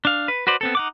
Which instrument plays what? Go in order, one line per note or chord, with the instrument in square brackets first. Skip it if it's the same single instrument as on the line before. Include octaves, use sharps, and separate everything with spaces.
[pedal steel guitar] D4 F5
B4
F#4 B4 C5 D5
B3 C4 A4
D#4 F#5 D6